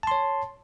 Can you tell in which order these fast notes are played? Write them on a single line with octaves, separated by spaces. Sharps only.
A5 C6 C#5